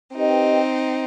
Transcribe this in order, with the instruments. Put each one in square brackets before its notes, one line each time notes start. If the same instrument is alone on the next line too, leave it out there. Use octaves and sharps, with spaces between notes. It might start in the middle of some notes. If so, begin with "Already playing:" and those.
[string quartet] C4 D#4 [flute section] G4 B4 D#5 G5